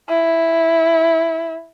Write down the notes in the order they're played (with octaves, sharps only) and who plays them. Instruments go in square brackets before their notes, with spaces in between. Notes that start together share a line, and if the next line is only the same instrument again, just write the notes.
[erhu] E4